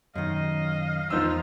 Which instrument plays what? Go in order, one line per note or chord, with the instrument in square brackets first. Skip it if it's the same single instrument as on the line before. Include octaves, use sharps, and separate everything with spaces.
[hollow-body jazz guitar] F#2 D#3 [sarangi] D#5 [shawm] F5
[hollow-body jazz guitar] E2 C5 [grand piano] F3 D#4 E6 [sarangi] F4